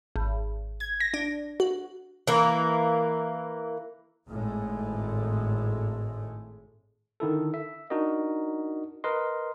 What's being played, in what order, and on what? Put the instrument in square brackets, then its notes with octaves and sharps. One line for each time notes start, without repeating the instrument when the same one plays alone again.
[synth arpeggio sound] G#1
G#6
A#6
D4
F#4
[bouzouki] E3 A#3
[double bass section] G#1 A2 G#3 A3
[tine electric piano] D3 D#3 E4 A4
E5
D4 D#4 F#4 A#4 D#5
A#4 B4 D#5 C6